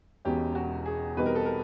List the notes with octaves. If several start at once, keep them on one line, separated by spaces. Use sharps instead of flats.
E1 E2 B2 G#3 C#4 G4
F#4
G#4
E2 B2 G3 C4 D#4 B4
A#4
A4
A#4